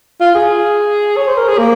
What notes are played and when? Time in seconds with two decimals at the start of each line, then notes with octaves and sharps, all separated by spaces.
0.21 F4
0.35 G#4
1.17 C#5
1.27 C5
1.37 A#4
1.48 G#4
1.58 A#3